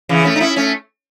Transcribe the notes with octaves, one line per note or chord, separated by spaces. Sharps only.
C#3 E3
A3 C#4
D#4
C#4 E4
A3 C#4